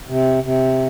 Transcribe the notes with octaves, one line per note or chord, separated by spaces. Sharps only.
C3
C3